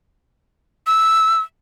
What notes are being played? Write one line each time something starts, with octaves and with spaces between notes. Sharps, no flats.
E6